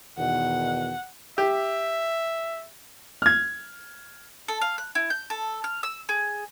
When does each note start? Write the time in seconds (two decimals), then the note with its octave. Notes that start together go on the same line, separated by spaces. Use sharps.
0.18 E2 B2 D#3 F#5
1.38 G4 E5
3.22 F6 G#6
4.48 A4
4.61 F5
4.78 F#6
4.95 E4
5.10 G6
5.30 A4
5.64 F6
5.83 E6
6.09 G#4